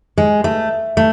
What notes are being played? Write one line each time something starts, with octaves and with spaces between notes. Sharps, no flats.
G#3
A3
A3